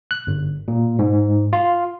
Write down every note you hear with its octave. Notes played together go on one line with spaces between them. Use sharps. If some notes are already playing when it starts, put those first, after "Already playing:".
F#6
G1
A#2
G#2
F4